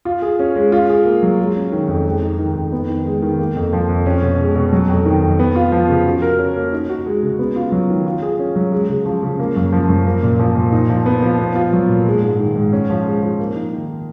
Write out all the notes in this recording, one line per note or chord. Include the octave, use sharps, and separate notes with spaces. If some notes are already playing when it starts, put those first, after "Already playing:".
F4
G#4
C#4
G#3
F4
G#4
A#3
F#3
G#3
C#4
D#3
F2
G#3
D#4
D#3
F2
B3
D#3
G#3
D#3
A#3
F2
F3
F2
C#4
B2
G#3
B2
F#3
F2
D#3
F2
B3
F4
F3
C#3
F#4
A#4
C#4
A#3
D#4
F#4
G#3
C#3
B3
F4
F#3
D#3
F4
G#4
C#4
F#3
G#3
C#3
F3
C#3
A#3
F#2
F3
F#2
A#3
A#2
F3
A#2
D#4
F3
B3
F3
B3
F4
F#3
A#2
G#3
G#2
D#3
G#2
C#4
F3
G#3
F3
A#3
D#4
D#3